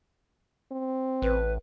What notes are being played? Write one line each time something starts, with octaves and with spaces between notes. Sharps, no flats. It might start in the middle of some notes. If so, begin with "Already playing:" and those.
C4
A1 B4